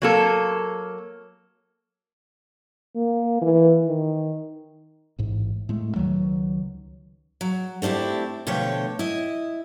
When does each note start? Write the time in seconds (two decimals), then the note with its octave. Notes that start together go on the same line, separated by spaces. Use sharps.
0.02 F#3 A#3 A4
2.96 A#3
3.42 E3
3.86 D#3
5.19 A1 G#2
5.69 A2 G#3 A3
5.96 C#2 G#2 D#3 F#3
7.41 F#3
7.82 A3 C4 D4 E4 G4
8.47 B2 D3 F3 A3 C#5 G5
8.99 E4 D#5